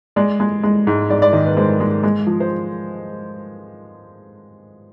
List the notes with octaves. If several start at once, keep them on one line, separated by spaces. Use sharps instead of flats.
G#3 D5
G#3
G#3
G#2
G#2 D5
D5
D#3 D#5
B4
G#3 C5
G#3
G#3
F3
C5